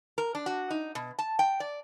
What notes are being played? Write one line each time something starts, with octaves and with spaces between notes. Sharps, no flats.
A#4
D4
F#4
D#4
B2
A5
G5
D5